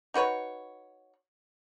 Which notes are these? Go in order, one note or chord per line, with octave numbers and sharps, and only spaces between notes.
D#4 F#4 B4 C#5